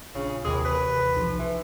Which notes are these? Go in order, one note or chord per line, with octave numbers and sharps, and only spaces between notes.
A#1 C#3
D#2 C3 E3 G#4
B4
B1 F3
E3